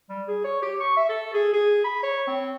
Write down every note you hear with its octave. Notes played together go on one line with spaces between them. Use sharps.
G3
G#4
C#5
G4
C#6
E5
A4
G#4
G#4
B5
C#5
C4